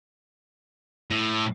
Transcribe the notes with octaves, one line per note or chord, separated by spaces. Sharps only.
A2